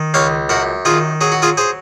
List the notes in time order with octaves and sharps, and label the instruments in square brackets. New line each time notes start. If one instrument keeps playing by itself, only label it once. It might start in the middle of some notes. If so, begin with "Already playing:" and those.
Already playing: [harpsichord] D#3
C#2 C#5 F5
F#2 F#4 A#4
D#3 F4 G#4
F#3 G#4
F#4
F4 G#4
G#4 C5